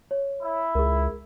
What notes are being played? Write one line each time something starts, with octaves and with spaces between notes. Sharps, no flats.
C#5
E4
C#2 G#4 A#4